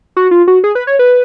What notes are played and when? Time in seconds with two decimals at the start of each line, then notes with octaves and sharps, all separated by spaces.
0.17 F#4
0.31 F4
0.48 F#4
0.64 G#4
0.75 B4
0.87 C#5
0.99 B4